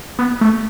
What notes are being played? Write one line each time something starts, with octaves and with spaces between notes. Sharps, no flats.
B3
A3